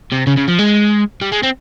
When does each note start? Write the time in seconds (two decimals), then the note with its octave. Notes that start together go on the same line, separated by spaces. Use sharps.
0.12 C3
0.27 C#3
0.37 C#3
0.48 F3
0.59 G#3
1.22 G3
1.32 G#3
1.43 C4